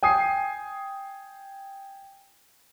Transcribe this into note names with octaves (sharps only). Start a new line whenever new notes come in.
G5 G#5 D#6 C7